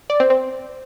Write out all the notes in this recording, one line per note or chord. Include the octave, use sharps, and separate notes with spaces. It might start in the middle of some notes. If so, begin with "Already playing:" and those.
D5
C4
C4